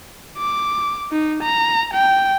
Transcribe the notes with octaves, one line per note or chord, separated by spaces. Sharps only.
D6
D#4
A#5
G5